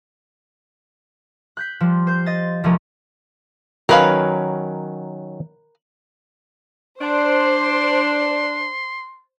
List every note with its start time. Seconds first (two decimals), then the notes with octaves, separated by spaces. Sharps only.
1.57 F#6 G6 B6
1.80 F3 G3
2.07 C5 G6
2.26 D#5 A6
2.64 C2 F3 G#3 A3 C#4 A#4
3.89 D#3 F#3 C#4 A#4 B4 F5
7.01 D4 C5 C6